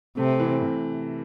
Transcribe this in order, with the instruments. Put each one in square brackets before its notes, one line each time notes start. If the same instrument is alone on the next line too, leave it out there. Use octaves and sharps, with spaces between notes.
[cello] C3 [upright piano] A3
[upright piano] E3
C3